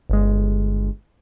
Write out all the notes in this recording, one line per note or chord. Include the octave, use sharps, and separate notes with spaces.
G1 G#3